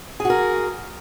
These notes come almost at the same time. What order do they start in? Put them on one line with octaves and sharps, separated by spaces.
G#4 F#4 A#4